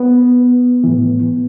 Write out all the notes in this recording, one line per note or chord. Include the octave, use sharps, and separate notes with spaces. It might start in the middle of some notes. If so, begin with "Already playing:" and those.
Already playing: B3
A2 E3